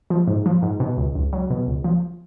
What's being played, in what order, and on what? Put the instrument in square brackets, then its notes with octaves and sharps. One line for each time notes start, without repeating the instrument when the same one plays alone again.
[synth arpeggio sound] F3
G#2
F3
G#2
B2
C#2
C#2
F#3
B2
C#2
F3